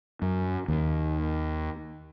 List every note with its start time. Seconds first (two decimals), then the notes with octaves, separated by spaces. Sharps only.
0.22 F#2
0.68 D#2